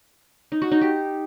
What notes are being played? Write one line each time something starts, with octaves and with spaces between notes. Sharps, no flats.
D#4
F#4
D#4
G4